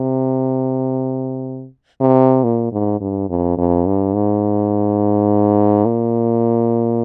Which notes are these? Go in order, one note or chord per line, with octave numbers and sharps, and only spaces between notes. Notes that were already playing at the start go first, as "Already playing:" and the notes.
Already playing: C3
C3
A#2
G#2
G2
F2
F2
G2
G#2
A#2